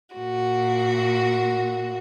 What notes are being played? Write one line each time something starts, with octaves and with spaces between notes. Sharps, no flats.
A#2 F#4